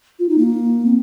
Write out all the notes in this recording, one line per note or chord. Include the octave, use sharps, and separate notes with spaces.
F4
D#4
A#3
C4